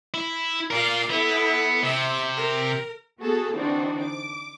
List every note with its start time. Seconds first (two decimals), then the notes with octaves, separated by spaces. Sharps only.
0.14 E4
0.71 F4 A#4 D5 F5
1.10 B3 E4 A4
1.83 C3 E5
2.36 A#4
3.20 B3 F#4 G#4 A4
3.53 D3 E3 C4 D4 D#4 F#4
4.01 D6